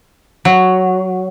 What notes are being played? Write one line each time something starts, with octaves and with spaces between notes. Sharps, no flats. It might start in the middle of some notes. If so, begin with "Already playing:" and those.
F#3